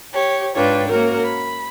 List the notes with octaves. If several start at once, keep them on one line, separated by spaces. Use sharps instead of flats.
G4 C#5
G#2 D4 F4 B4 C#5 G5
A#3 C#4 F#4 A#4
B5